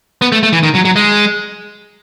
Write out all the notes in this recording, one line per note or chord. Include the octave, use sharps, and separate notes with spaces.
B3
A3
A3
E3
D#3
F#3
F#3
G#3